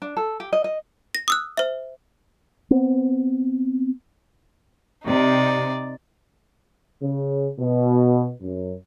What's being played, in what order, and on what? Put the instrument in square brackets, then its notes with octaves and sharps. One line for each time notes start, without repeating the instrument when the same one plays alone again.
[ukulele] D4
A4
G4
D#5
D#5
[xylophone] A#6
D#6 E6 F#6
C5 E5
[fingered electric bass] B3 C4
[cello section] C3 [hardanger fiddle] D#4 D5
[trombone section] C#3
B2
F#2